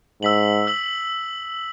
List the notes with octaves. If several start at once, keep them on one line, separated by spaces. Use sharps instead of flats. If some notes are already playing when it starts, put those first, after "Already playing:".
G#2 E6 B6 F#7
E6 B6 F#7